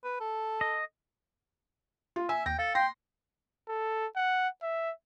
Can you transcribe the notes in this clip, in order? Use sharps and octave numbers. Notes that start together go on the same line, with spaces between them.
B4
A4
D#5
F4
E5 G#5 E6
D#2 G5 A#6
A4 F5
G5 C6 A#6
A4
F#5
E5